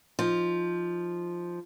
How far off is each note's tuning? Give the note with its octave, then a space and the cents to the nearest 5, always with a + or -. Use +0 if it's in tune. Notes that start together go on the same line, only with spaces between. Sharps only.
F3 +0 D#4 +0